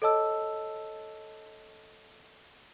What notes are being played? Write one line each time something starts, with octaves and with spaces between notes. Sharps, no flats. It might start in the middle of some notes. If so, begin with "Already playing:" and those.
A4 C#5 D#5 A5 E6